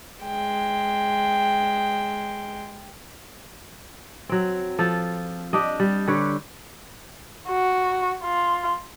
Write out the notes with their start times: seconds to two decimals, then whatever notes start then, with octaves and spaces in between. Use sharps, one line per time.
0.25 G#3 G5
4.29 F#3 C4
4.79 F3 A4
5.53 D4 G4 D#5
5.80 G3
6.07 D3 G4 B4 C#5
7.48 F#4
8.24 F4